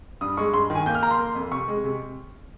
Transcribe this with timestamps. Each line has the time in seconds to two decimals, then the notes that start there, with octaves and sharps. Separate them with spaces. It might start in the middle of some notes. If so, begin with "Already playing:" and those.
0.21 G2 D#6
0.37 G#3 C#6
0.54 G2 C6
0.70 D#3
0.75 G#5
0.86 A#3 G6
0.95 F6
1.03 A#3 A#5
1.11 C6
1.19 A#3
1.35 F2
1.51 C3 C#6
1.68 G#3
1.84 C3